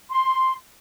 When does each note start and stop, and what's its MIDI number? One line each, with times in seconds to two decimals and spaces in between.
0.10 0.52 84